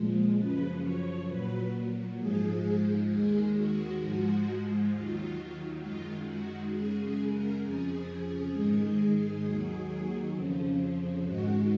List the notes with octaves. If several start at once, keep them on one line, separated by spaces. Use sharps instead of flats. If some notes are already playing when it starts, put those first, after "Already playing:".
Already playing: A#2 F3 G#3
F#2 C#3 F3 B4
C#5
A#2 F#3 B4
G#2 F3 G#3 G#4
D#2 D#3 G#3 G#4
F#4
G#2 F3 G#3
D#2 D#3 F#3 F4
F#2 D#3 G#3 F4
F#4
F#2 C#3 G#3 G#4
G#4
A#4
F2 C#3 F3 G#4
G#2 D#3 G#3
D#2 D#3 F#3
F2 C#3 F3
G#2 D#3 G#3 F#4